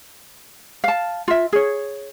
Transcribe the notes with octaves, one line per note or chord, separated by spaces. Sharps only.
F5 A5
F4 E5
G#4 C#5